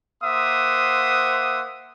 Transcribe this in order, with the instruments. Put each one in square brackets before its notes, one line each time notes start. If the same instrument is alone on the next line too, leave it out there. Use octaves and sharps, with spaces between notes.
[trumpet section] A#3 C5 E5 F#5 C6 D#6